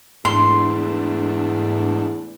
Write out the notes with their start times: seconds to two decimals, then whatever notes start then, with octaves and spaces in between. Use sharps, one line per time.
0.25 E2 G#2 A3 D4 C6